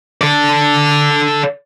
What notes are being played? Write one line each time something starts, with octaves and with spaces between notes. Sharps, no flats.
A4 D5